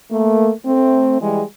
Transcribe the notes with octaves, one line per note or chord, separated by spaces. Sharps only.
A3 A#3
A3 C4
E3 G3 G#3